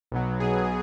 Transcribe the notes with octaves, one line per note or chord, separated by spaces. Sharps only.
B1 B2 F#3
B1 B2 F#3 G#4